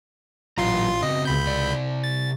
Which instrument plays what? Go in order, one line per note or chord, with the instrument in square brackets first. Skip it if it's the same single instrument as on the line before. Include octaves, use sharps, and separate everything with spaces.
[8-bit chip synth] A1 F4 C6 [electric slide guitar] A#2 F#3 A#5
[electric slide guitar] C#3 C4 F#4 [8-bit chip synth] D#5
[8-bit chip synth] C#2 B5 G6
[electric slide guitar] C3 D5
[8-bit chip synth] A6